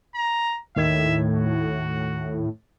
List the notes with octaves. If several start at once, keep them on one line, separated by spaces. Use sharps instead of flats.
A#5
D#2 A2 D#3 E5 G#6
F#4